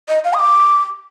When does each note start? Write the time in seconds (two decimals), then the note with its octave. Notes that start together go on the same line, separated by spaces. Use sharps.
0.08 D#5
0.24 F5
0.34 D#6
0.39 D6